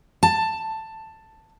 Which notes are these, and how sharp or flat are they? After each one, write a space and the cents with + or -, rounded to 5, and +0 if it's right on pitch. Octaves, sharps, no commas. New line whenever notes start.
A5 +10